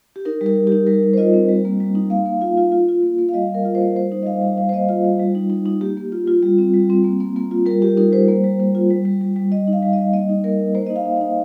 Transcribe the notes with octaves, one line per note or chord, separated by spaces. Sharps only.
G4
D#4 A#4
G3
A#4
G3
G4
D#4
G3 A#4
G3
C5
F4 D#5
C4
G3
A#3
G3
D#4
A#3 F5
A#3
F4 F5
F4
F4
F4
A#3
A#3
F5
G3 D#5
G3
A#4
F4
C5
A#3
G3 C5
D#4
D#5
G3 F5
G3
G3 F5
C5
A#3 D#5
F4 D#5
G3
G3
D#4
D#4
D#4
A#3 G4
A#3
F4
F4
G3
C4
G3
C4
A#3
A#3
A#3
F4
G3 A#4
G3 G4
D#4 A#4
G3 C5
A#3
G3
A#3
F4
G3
G3
G3
G3
G3 D#5
D#4
F5
G3
D#5
G3
A#3 D#5
D#4
A#3 A#4
A#3
A#3 C5
D#4 D#5
F5
D#4
D#5
D#4